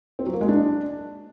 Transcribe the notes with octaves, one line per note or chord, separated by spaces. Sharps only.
C4
F#3
A#3
G#3
D4